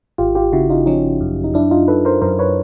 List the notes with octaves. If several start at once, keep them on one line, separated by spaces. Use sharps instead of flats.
G#1 F4 G4
F4 G4
C#3 E4 F#4
D#4 F4
F3 C#4 D#4
F#2
D#4
F#2 D4 E4
D#4 F4
F#2 A4 B4
A#4 C5
F#2 A#4 C5
B4 C#5